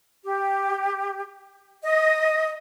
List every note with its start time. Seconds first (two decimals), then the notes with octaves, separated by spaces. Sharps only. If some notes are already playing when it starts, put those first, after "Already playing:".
0.24 G4
1.83 D#5